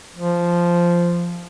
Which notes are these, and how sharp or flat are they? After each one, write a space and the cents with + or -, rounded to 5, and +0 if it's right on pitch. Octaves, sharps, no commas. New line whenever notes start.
F3 -10